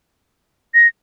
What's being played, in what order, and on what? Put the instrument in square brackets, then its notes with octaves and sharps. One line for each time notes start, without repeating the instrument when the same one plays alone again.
[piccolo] A#6